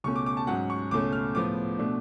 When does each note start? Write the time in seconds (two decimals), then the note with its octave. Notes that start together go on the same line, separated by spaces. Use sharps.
0.04 C#2 B2 A3 C#4 C#6
0.16 D6
0.26 D6
0.37 A5
0.47 G#2 F#3 C#4 F#5
0.70 C#6
0.91 C#2 B2 A3 C#4 D6
1.13 F6
1.35 A2 F3 B3 D6
1.79 B2 A3 D4